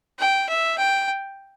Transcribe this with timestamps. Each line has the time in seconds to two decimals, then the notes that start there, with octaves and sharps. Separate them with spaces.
0.19 G5
0.49 E5
0.78 G5